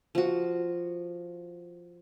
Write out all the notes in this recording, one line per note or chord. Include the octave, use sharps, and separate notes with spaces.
F3 F#4